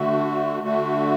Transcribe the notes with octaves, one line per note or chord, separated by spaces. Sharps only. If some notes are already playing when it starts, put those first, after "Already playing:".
Already playing: D3 A3 F#4
D3 A3 F#4